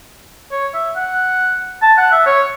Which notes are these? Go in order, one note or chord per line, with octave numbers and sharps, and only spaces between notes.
C#5
E5
F#5
A5
F#5
E5
C#5